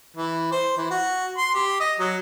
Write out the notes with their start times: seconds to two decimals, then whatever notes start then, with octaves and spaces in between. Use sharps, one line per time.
0.17 E3
0.52 C5
0.77 E3
0.91 F#4
1.38 C6
1.55 G4
1.80 D#5
2.00 F#3